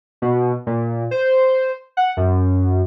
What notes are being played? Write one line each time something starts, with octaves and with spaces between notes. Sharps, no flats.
B2
A#2
C5
F#5
F#2